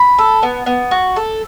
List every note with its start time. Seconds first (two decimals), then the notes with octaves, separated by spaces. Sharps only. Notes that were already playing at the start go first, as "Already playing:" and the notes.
Already playing: B5
0.18 A4
0.43 B3
0.66 B3
0.91 F#4
1.16 A4